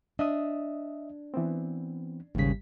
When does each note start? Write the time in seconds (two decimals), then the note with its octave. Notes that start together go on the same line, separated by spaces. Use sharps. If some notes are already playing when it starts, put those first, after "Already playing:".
0.19 D4 D#5 E5 D#6
1.34 E3 B3 C4
2.35 G#1 D#2 G#2 C#3 G3 B6